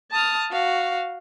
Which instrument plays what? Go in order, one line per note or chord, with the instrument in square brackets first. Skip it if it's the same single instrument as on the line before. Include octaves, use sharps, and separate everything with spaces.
[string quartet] A5 D#6 F6
F#4 F5